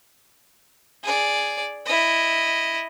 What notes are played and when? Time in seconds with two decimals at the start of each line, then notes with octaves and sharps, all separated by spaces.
1.03 G#4 D5
1.86 E4 D#5